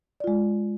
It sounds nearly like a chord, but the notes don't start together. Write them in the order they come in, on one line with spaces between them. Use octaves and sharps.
D5 F4 G#3